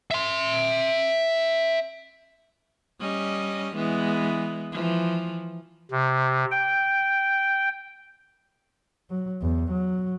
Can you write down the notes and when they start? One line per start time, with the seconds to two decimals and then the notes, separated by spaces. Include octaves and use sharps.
0.11 E5 C6
3.00 G3 C#4 D#5
3.76 E3 G#3 B3
4.72 E3 F3
5.91 C3
6.51 G5
9.10 F#3
9.42 E2
9.71 F#3